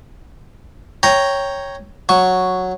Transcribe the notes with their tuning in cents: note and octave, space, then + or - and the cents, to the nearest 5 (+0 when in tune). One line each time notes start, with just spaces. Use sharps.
C#5 +0 G5 +0 A#5 +0
F#3 -5 C#6 +0